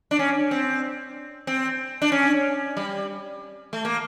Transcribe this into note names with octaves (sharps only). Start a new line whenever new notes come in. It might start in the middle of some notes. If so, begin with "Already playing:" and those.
D4
C#4
C4
C4
D4
C#4
G3
A3
A#3